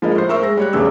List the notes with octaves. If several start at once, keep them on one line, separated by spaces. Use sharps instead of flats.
F3 G#3 E4 A#4 D#5
A2 C5
A#4 C5 E5 C#6 E6
G#3 A#6
G3 C#5 F#6
E1 E2 A2 C#3 E6